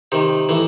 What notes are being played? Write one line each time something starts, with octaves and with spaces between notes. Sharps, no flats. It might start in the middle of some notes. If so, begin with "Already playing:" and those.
C3 D#3 D#4
A2 E3